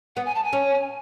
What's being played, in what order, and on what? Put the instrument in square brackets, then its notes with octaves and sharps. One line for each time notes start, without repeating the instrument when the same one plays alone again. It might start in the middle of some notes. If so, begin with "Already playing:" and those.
[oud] B3 [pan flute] F#5
[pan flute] G#5
A5
G#5
[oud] C#4